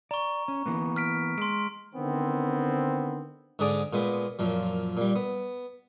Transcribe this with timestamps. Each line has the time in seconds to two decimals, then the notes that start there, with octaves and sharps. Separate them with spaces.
0.11 D5 A#5 C#6
0.48 C#4
0.66 E3 A#3 B3
0.96 F6 B6 D7
1.38 G#3 C6 D7
1.94 D3 D#3 B3 C4
3.59 G#2 D3 D4 G#4 D5 D6
3.93 A#2 G#3 B3
4.39 F#2 A#2 F3
4.97 A#2 G3
5.16 B3